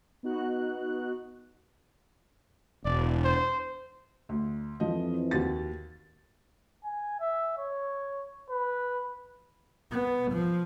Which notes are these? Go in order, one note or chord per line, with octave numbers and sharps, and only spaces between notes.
B3 D#4 F#4 F#6
E1 D5
C5
D2
F2 E3 F3 D#5
D#2 F#4 A6
G#5
E5
C#5
B4
B3
F3